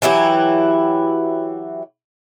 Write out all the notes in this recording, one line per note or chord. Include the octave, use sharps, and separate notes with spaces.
E3 F#3 E4 G4